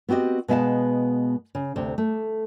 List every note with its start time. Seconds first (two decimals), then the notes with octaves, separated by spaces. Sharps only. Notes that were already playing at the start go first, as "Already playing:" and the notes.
0.09 B3 C4 F#4 G4 D#5
0.48 B2 G#3 B3 E5 F5 A5
1.55 C#3
1.76 D2 C3 C5
1.98 A3